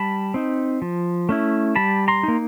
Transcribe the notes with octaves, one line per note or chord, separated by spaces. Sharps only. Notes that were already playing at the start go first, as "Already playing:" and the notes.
Already playing: G3 A5 B5
C4 D#4
F3
A3 C#4 E4
G3 A5 B5
A#5 C6
A#3 D#4